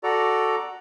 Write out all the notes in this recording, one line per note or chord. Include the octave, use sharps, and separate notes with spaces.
F#4 A4 D5 A#5